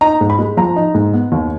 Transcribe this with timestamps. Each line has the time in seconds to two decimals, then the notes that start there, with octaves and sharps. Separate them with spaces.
0.01 D#4 A#5
0.21 G#2
0.30 B5
0.39 G#3
0.57 F3 A#5
0.76 D#4
0.95 G#2
1.13 B3
1.32 D#2